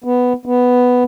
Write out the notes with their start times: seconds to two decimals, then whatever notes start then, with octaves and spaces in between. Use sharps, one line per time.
0.04 B3
0.46 B3